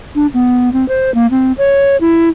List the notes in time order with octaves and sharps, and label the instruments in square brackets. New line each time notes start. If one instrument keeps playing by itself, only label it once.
[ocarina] D4
B3
C4
C5
A#3
C4
C#5
E4